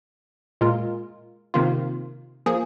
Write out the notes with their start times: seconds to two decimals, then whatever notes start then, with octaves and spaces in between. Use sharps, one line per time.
0.61 A#2 G#3 F4 A#4
1.54 C3 D#3 A#3 F4
2.46 F3 A#3 G#4